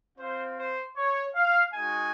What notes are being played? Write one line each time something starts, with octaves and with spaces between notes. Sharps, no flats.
C4 F4 C5
C5
C#5
F5
G#3 D#4 F#4 G#5